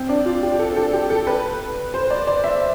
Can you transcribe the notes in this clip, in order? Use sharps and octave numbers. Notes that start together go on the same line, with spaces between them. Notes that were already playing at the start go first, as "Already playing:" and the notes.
Already playing: C4
D4
F4
G4
A4
A4
G4
A4
B4
C5
D5
D5
E5